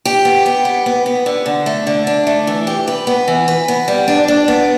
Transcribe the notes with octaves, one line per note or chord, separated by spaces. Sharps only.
G4
B3
G4
B3
B3
B3
D3
D3
A3
D3
D4
A3
E3
G4
B4
B3
E3
B4
B3
G3
D4
D4
B3